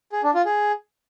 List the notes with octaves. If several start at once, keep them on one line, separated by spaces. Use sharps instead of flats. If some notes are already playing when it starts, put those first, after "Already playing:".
G#4
D4
F4
G#4